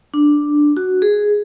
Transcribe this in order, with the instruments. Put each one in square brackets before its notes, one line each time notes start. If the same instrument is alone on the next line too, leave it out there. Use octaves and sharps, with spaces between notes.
[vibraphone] D4
F#4
G#4